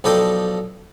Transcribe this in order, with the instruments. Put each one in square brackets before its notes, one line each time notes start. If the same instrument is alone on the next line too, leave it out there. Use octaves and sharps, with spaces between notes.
[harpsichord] B1 F3 D4 A4 D#5 G5